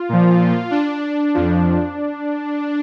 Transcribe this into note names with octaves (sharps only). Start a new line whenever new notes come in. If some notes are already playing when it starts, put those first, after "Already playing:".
Already playing: F4
A#2 F3
D4
F2 F3